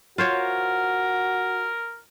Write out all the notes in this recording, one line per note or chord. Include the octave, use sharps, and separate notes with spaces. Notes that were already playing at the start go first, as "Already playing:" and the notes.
F4 F#4 A#4 C5 C#5